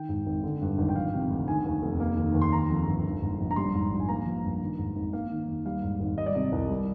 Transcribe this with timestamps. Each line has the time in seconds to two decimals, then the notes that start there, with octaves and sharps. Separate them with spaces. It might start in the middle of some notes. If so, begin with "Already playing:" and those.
Already playing: D#3 G5
0.09 G#2
0.26 G#1
0.44 D3
0.61 G2
0.78 G#1
0.89 G5
0.96 F3 F5
1.13 C3
1.30 D2
1.48 D#3 G#5
1.66 D#2
1.82 F1
2.00 A#3
2.18 D#3
2.34 D#2
2.42 C6
2.52 D#3 A#5
2.70 F2
2.87 G1
3.04 D#3
3.21 G#2
3.39 A#1
3.51 A#5
3.56 G3 C6
3.74 G#2
3.91 A#1
4.00 G#5
4.09 A#3 A#5
4.26 F3
4.44 G2
4.61 D#3
4.78 G#2
4.96 G#1
5.13 A#3 F5
5.31 D#3
5.48 D#2
5.65 G3 F5
5.83 G#2
6.00 G#1
6.18 G3 D#5
6.26 D5
6.35 C3 D#5
6.52 C2
6.70 G3